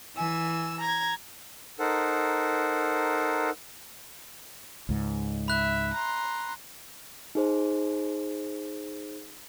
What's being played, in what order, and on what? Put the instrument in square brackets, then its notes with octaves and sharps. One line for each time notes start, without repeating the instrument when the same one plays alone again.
[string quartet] E3 G#5 E6
A#5 G#6
[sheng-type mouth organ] D#4 A4 A#4 C5 F#5
[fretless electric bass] C#2 G#2
[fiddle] E5 [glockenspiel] B5 F#6
[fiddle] A#5 C6
[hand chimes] D#4 G#4 C5